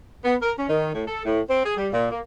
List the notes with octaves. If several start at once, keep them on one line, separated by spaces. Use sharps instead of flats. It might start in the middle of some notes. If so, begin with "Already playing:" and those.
B3
A#4
C#4
D#3
A2
A4
A2
C4
G#4
G3
A#2
A#3